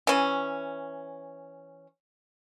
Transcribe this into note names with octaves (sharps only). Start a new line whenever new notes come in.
E3 C#4